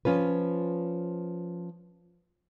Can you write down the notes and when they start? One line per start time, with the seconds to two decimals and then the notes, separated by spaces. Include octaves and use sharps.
0.05 F3 C#4 F4 B4